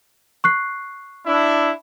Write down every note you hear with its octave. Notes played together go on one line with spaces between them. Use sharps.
C#6 F#6 C7
D4 E4